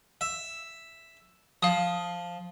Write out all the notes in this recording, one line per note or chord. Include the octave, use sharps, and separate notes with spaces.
E5
F3 F5 D#6